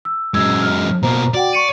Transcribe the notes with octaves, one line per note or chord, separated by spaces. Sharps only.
E6
F#2 G#3 E6 G#6
F6
B2 A#3 C5 A#5
F#4 D5 F#5 G5
C#6 C#7 D#7